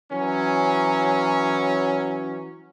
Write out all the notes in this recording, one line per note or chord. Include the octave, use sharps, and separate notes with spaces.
E3 F#3 C#4